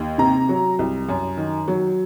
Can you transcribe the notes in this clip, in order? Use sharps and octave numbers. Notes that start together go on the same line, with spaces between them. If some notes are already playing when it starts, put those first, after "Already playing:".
Already playing: D#2
C3 A#5
F#3
C2
F#2
D#3
F#3